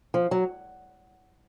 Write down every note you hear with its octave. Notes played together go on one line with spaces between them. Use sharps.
F3
F#3